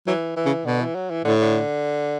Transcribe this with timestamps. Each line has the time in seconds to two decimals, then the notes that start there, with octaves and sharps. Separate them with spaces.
0.07 E3 F#3
0.36 E3
0.46 C#3
0.65 B2 D3
0.81 E3
0.95 F#3
1.10 E3
1.24 A2 D3
1.42 D3